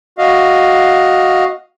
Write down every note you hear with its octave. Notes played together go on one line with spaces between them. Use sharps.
F#4 D#5 F5